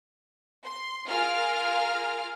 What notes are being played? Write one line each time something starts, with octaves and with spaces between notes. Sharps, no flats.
C6
F4 G#4 A#4 F5 F6